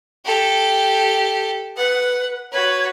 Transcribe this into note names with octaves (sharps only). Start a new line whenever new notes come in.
G4 A4
B4 F#5
F#4 B4 C#5